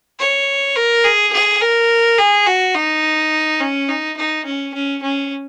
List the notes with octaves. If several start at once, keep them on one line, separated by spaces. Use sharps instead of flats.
C#5
A#4
G#4
G#4
A#4
G#4
F#4
D#4
C#4
D#4
D#4
C#4
C#4
C#4